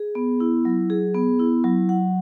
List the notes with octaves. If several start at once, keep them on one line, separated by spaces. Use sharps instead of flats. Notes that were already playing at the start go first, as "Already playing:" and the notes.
Already playing: G#4
B3
E4
F#3
G#4
B3
E4
F#3
F#5